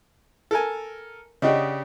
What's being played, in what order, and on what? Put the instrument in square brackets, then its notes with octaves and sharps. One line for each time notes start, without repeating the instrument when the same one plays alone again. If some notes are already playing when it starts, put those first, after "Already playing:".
[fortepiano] A4 A#4 G#5
[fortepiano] C#3 D4 G4 [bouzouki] D#5 F#5